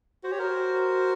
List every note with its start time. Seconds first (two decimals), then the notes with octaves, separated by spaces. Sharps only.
0.24 F#4 C5
0.31 G4 C#5
0.38 F#4 A#4 C5